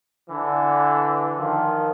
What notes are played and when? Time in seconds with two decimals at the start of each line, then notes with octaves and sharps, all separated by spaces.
0.29 D3 E3
1.38 D#3 F3